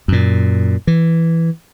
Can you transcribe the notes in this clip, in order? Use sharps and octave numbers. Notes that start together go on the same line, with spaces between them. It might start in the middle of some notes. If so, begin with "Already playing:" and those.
F#2 A#2
E3